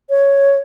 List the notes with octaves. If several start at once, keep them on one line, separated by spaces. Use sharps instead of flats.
C#5